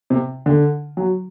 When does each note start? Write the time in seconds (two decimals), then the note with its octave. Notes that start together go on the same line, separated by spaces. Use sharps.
0.10 C3
0.46 D3
0.97 F#3